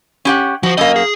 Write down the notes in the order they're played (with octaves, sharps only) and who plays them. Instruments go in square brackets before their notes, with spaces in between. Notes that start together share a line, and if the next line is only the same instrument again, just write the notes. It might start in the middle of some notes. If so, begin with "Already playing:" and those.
[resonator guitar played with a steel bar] C#4 G4 F#5
[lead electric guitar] F3 C5 [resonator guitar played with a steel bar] F#4
[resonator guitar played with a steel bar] F#2 A#3 [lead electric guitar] D#5
[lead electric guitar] G#4